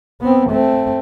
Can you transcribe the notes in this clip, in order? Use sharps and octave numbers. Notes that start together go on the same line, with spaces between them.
B3 C4
A3 C4